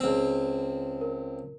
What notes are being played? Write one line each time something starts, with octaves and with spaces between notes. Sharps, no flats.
C#2 C4
A#4